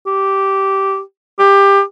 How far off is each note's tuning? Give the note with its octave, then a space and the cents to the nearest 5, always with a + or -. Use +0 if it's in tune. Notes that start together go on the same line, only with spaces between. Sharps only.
G4 -10
G4 +20